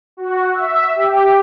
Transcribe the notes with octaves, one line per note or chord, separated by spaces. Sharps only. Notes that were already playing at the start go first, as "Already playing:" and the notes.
F#4
E5
G4